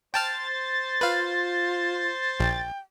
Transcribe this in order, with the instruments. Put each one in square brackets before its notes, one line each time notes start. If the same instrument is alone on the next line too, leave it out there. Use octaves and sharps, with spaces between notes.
[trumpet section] C5 [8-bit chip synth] G5 A5 F6 [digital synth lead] A6
[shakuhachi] F4 [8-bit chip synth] B4 F5
[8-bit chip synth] A#1 [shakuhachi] G5